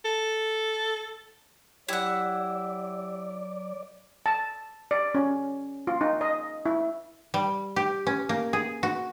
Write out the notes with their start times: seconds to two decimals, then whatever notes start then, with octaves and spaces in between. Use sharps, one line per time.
0.05 A4
1.89 F#3 E4 G4 D5 F#5 G5 E6
4.26 A5
4.91 D5
5.15 C#4
5.87 F4
6.01 D#4
6.21 D#5
6.66 E4
7.34 G3
7.76 G4
8.07 C#4
8.29 A#3
8.53 G#4
8.83 F#4